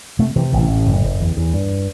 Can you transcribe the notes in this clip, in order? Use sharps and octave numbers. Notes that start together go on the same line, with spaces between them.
C3 A3
C3 E3
A1 E3
A2
F#1
F#1
E2
E2
G2